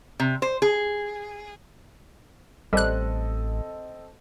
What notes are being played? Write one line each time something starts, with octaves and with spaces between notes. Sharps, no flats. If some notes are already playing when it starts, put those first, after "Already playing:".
C3
C5
G#4
A1 G3 C4 A4 D#5 F#6